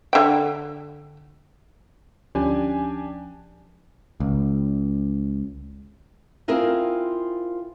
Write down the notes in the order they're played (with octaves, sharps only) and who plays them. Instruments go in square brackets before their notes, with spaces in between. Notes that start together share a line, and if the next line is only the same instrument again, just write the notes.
[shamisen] D3 G5
[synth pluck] D2 F3 C#4 [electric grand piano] D4 G4 G#5
[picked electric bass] C#2
[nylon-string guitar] C4 E4 F4 G#4 A#4 C5